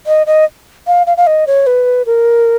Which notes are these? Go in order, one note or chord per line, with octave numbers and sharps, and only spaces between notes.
D#5
D#5
F5
F5
F5
D#5
C#5
B4
A#4